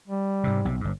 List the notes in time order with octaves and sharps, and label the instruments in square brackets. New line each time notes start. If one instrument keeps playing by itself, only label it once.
[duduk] G3
[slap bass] G#2 C3
B1 C3
G1 G2